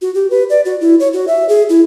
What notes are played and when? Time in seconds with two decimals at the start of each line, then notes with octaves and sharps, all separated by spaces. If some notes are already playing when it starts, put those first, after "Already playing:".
0.02 F#4
0.15 G4
0.30 B4
0.50 D5
0.65 F#4
0.81 E4
1.00 C#5
1.13 F#4
1.28 E5
1.49 G#4
1.69 E4